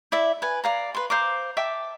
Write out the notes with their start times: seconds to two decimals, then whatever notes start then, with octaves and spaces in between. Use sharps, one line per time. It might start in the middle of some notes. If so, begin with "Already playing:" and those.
0.12 E4 D5 E5
0.42 B4 G#5
0.64 D5 F5 A#5
0.95 B4 C6
1.10 C5 F5 A#5 D6
1.57 E5 G5 A5 D6